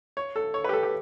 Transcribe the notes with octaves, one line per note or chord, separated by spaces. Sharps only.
C#5
A4
C#5
G4 B4
A4
G4